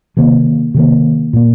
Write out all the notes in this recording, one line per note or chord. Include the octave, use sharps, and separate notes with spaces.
C3 D#3 A#3
C3 D#3 A#3
A#2 A#3